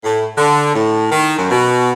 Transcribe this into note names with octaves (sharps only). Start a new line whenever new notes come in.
A2
D3
A2
D#3
F#2
B2